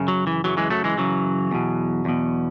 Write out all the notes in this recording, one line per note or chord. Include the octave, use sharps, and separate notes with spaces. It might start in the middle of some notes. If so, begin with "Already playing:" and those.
Already playing: F#2 C#3
F#3
E3
F#2 C#3 E3 F#3
E3 G#3
F#3 A3
E3 G#3
F#2 C#3 E3 F#3
E2 B2
E2 B2